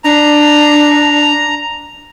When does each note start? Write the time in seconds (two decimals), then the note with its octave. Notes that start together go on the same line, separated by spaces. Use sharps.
0.04 D4 A#5